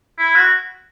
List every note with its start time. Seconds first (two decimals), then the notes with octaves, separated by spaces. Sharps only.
0.19 E4
0.35 F#4